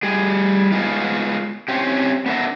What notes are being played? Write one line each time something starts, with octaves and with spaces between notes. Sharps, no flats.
G3 G#4
G#3 B3 D#4 F4
C4 C#4 G4
B3 D4 A#4 E5